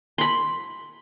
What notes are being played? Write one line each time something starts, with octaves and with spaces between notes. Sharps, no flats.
B5 C6